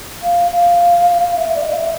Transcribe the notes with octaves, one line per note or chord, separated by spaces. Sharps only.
F5
F5
F5
E5
D5
D#5
F5
E5